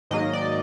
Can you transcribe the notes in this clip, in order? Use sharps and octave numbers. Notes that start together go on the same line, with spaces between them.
G#2 D#3 F#3 A#3 D#5
D5